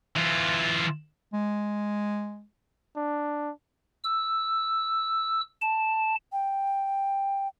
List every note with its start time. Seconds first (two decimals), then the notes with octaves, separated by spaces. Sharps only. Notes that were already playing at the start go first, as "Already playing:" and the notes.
0.16 E3 F4
1.33 G#3
2.96 D4
4.04 E6
5.62 A5
6.32 G5